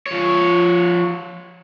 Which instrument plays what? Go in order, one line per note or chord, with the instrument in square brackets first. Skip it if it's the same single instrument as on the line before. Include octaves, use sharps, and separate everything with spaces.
[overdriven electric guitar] F3 C#5